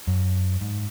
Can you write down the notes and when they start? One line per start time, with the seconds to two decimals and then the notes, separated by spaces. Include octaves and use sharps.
0.07 F#2
0.61 G#2